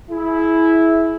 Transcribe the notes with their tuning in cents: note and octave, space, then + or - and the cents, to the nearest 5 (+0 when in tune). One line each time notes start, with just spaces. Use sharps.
E4 -5 G#4 +30